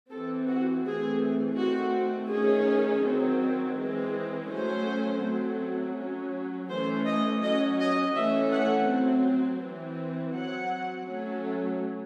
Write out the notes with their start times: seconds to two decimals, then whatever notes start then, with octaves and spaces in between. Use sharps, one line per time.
0.10 E3 C4 A4
0.47 F#4
0.83 E3 A3 C4 G#4
1.57 D#3 A3 C4 F#4
2.30 D#3 A3 C#4 G#4
3.03 D#3 F#3 C4
3.76 E3 G#3 C4
4.49 F#3 A3 C#4 C5
5.23 F#3 A3 C4
5.95 F#3 C#4
6.69 E3 A3 C#4 C5
7.05 D#5
7.41 F#3 C#4 D#5
7.79 D#5
8.15 E3 A3 C#4 E5
8.52 F#5
8.88 F#3 C4
9.61 E3 C4
10.34 F#3 C4 F#5
11.08 F#3 A3 C#4